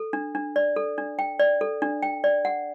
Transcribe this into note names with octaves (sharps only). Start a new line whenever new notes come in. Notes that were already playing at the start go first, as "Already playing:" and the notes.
Already playing: A4
D4
D4
D5
A4
D4
G5
D5
A4
D4
G5
D5
F#5